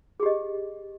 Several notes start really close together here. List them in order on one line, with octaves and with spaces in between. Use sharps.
G#4 G4 D#5